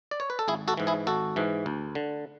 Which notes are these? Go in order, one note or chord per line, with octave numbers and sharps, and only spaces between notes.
D5
C#5
B4
A4
G#1 E4 G#4
F#4 A4
G#2 E3
E4 G#4
G#1 F#4 A4
G#2 E3
D2
D3